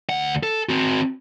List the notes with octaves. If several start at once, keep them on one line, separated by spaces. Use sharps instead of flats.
D2 F#5
A4
C4 F#4